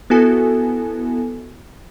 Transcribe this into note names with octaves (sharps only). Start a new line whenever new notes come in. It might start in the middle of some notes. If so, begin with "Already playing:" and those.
B3 E4 F#4 A4 G#5